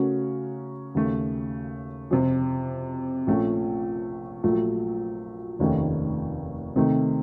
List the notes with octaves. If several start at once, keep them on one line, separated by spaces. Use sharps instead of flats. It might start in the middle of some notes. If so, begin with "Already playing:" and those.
Already playing: C#3 A3 C#4 F#4 A#4
D#2 C#3 A3
F2 C3 F3
A#1 A#2 A3 C#4
A#1 A#2 F#3 A3
F1 D#2 D#3 A3 C#4
C3 D#3 A3